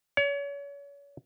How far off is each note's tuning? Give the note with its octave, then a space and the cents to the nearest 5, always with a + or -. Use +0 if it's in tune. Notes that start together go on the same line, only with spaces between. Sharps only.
C#5 +35